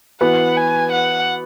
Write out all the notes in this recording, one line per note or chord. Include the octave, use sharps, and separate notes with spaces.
E3 B3 F#4 B4 F#5
G#5
F#5